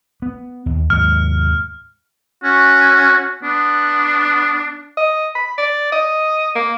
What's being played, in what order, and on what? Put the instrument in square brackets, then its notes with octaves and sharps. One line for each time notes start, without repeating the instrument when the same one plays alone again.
[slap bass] B3
D#2
[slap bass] D#2 G#2 [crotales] F6
[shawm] C#4 [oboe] F#4
[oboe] B3 [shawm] D4
[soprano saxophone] D#5
B5
D5
D#5
A#3